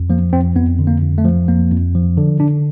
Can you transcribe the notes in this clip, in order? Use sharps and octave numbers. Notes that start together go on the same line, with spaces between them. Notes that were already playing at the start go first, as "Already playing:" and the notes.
Already playing: F2
F3 A#3
F2 C4
F2 B3
D3
A#3
F2
A3
F3
F2 A#3
F2
F3
D3
D3 D4